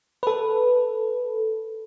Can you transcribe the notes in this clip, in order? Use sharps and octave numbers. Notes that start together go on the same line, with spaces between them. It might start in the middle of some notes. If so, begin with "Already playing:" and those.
A4 B4